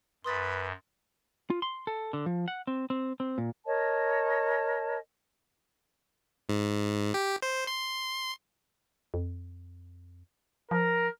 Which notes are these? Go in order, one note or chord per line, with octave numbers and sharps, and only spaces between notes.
F#2 B4 C6 D#6 A6
F4
C6
A4
D3
F3
F#5
C4
C4
C4
A#2
A#4 C#5 D#5 A5
G#2
G4
C5
C6
F2
F3 A#4